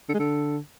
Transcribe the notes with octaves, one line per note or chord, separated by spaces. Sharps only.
D3
G#3
D3